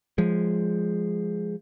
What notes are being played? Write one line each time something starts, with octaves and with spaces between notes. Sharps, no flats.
F3 G#3